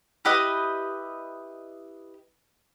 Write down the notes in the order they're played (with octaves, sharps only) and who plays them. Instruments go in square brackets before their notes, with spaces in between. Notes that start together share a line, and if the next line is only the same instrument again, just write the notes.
[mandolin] E4 G4 B4 D#5